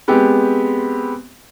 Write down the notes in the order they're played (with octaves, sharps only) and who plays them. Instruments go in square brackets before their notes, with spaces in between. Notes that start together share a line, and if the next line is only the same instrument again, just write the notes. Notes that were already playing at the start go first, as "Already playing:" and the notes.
[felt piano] G#3 B3 C4 G4